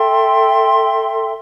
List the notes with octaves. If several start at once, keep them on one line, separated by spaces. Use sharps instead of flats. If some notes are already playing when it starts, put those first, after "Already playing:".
Already playing: A4 E5 G5 C6